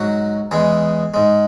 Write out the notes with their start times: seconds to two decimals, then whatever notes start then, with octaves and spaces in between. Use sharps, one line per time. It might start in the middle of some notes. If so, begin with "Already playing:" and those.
Already playing: G#2 F#3 F#4
0.51 E2 E3 G#3 G#4
1.14 G#2 G#3